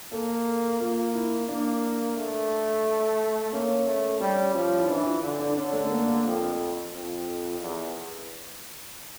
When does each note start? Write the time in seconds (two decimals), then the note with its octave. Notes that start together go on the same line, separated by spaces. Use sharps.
0.12 A#3 A4
0.80 A#3 F4
1.15 E4
1.48 A#3 D4
2.16 A3
3.52 A#3 C#4
3.86 A3
4.20 G3 C#4
4.54 F3 C#4
4.79 E4
4.88 E3 D4
5.06 F4
5.23 D3
5.39 D4
5.56 D3 C#4
5.73 A3
5.85 A3
5.91 A#3
6.07 A#3
6.24 F2
6.92 F2
7.60 E2